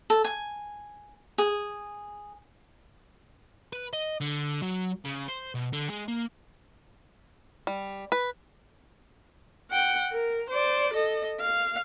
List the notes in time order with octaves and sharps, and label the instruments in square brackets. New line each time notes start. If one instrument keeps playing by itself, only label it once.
[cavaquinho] A4
G#5
G#4
[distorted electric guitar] B4
D#5
D3
F#3
C#3
C5
B2
D3
G#3
A#3
[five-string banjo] G3
B4
[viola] F#5 G5
A#4
C5 D5
A4 D#5
F5